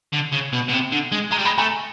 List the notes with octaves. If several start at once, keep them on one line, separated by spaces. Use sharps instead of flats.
D3
C#3
B2
B2
C3
D3
G#3
G#3 A#5
G3
G#3 B5
A3 G#5 A#5